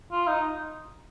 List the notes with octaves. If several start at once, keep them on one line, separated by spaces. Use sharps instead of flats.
F4
D#4